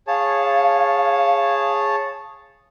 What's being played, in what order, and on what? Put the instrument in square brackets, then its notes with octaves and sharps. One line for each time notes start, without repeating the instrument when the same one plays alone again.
[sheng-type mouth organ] G#4 C#5 A5 [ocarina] F5